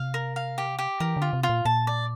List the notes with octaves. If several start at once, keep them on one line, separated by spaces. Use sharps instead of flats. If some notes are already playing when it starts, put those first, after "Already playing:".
Already playing: C3 F5
A#4
F5
G4
G4
E3 A#4
D3
F4
C3
F4
A#2
A#2 A5
D5